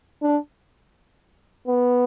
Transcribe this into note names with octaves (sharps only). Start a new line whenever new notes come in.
D4
B3